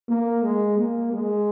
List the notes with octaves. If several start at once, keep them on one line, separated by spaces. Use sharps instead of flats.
A#3
G#3
A#3
G#3